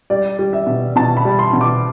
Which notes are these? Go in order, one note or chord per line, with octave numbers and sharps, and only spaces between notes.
G3 D5
G3
E5
B2
B2 A5
B5
G3
C6
B2
D6